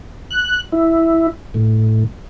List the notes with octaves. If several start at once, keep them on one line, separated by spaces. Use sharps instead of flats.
F#6
E4
A2